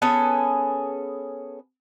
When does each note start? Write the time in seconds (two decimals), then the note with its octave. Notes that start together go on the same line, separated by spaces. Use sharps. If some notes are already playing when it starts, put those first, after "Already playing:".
0.02 B3 C#4 G#4 A4